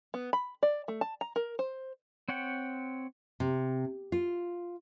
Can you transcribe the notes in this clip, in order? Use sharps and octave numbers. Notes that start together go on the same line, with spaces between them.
B3
B5
D5
A3
A5
A#5
A#4
C5
C4 C#5 F#5 G5
C3
F4